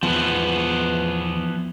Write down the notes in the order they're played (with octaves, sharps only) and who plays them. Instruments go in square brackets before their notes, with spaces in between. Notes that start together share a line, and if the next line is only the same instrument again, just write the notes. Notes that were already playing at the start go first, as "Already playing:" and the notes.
[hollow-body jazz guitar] E2 [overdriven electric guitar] F3 B3